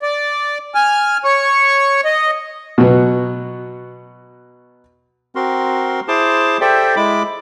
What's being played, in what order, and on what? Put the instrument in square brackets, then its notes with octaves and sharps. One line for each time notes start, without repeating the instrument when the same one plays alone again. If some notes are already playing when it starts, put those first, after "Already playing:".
[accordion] D5
G#5 F6
C#5 C#6
D#5
[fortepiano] B2 F#3 B3
[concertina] C4 F#4 A#4 C6
E4 G#4 C5 A5 C6 D6
G4 A4 C5 D5 E5 G5
G#3 E4 B5 D6